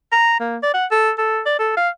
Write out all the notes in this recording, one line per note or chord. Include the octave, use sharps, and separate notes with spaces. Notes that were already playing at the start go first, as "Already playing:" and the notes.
A#5
A#3
D5
F#5
A4
A4
D5
A4
F5